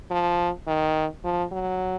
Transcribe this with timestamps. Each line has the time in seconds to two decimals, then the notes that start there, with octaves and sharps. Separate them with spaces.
0.11 F3
0.67 D#3
1.24 F3
1.52 F#3